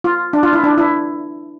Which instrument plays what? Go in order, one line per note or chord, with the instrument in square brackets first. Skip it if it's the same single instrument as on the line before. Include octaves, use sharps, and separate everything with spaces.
[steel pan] F4
D4
F4
E4
D4
E4